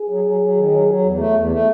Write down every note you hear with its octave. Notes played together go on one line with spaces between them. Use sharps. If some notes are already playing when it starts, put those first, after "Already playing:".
Already playing: G#4
F#3
F#3
F#3
D#3
F#3
F#3
E2
A3
E2
A3